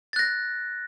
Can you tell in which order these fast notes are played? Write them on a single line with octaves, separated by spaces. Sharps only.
A6 F#6 A#6